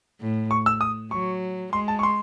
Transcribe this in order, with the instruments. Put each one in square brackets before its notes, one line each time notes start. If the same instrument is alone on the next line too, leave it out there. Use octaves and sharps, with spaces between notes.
[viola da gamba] A2
[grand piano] C#6
E6
D#6
[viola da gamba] F#3 [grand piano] C#6
[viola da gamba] G#3 [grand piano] C6
[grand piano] A5
C#6
C6